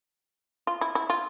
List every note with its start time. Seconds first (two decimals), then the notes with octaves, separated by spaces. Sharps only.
0.67 F4
0.81 E4
0.95 E4
1.10 F4